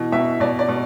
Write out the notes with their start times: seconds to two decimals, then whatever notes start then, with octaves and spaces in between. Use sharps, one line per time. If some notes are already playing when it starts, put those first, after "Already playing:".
Already playing: B2 E3
0.12 B2 E5
0.40 B2 D5
0.59 D5
0.68 B2